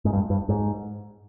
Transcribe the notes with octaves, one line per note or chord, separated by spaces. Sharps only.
G#2
G2
G2
G#2